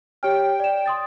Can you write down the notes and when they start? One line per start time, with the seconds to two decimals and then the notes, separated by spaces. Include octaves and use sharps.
0.23 G4 C#5 G5 F6
0.60 D5 E7
0.86 C6 D#6 A6